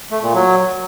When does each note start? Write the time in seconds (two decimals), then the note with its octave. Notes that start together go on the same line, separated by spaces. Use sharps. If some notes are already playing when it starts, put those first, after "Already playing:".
0.11 A3
0.23 A#2
0.35 F#3